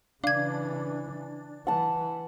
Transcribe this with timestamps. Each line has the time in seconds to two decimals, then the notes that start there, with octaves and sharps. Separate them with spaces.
0.24 C#3 E3 D4 F5 G#6
1.67 E3 F#5 A5